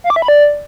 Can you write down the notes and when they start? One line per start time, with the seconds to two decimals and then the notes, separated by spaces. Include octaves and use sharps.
0.04 F5
0.10 D6
0.16 E5
0.22 B5
0.28 D5